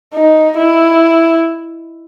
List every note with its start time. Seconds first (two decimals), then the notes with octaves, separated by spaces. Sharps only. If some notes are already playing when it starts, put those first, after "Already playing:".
0.14 D#4
0.57 E4